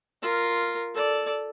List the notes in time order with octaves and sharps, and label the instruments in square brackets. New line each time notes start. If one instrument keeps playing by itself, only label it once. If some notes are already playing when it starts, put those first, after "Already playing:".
[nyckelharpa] F4 A#4
A4 D5